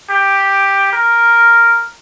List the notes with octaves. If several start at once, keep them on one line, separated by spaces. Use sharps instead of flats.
G4
A#4